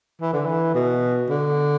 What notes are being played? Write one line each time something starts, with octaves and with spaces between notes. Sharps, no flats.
E3
D3
E3
B2
D3